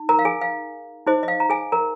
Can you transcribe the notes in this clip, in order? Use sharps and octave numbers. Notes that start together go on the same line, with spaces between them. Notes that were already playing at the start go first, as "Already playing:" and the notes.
Already playing: D#4
A#4 A#5
F5
G#4 G#5
F5
D#4 G#4 C5 D#5
D#5
F5
A#5
G#4 G#5
A#4 A#5